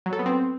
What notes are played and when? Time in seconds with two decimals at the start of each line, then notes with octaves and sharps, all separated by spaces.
0.06 F#3
0.13 A4
0.19 B3
0.26 C4